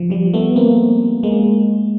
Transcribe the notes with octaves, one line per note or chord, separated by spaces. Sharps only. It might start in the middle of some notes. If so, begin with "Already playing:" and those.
Already playing: F3
F3 G3
A3 B3
A#3 C4
G#3 A#3